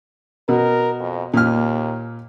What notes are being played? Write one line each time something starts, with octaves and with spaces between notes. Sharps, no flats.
B2 A#4
F2
D#2 A#2 F6